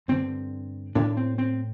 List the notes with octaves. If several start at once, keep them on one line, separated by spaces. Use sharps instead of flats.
G2 D3 C4
A2 D4
C4
C4